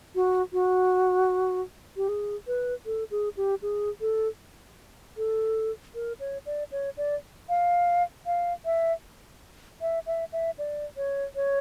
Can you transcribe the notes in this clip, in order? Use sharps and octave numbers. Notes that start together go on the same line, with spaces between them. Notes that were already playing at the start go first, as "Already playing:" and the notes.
F#4
F#4
G4
G#4
B4
A4
G#4
G4
G#4
A4
A4
A#4
C#5
D5
C#5
D5
F5
F5
E5
E5
E5
E5
D5
C#5
C#5